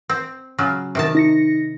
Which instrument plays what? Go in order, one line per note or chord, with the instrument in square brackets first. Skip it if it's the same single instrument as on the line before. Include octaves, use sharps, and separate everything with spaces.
[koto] C4
C#3 F#3 F4
C3 D#3 A5
[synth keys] D#4 A#6 C#7